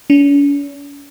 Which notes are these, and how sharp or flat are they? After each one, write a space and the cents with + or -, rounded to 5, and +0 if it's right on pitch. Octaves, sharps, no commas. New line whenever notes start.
C#4 +45